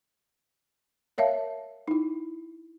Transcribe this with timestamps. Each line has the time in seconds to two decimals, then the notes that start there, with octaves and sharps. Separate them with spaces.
1.18 A#4 C#5 E5 F5 A5
1.88 D#4 E4